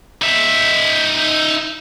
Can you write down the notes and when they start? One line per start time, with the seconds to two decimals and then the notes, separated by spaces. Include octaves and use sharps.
0.22 D#4 E5